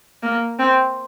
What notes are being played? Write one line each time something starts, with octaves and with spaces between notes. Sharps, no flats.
A#3
C4